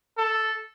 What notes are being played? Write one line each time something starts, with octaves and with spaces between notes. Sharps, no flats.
A4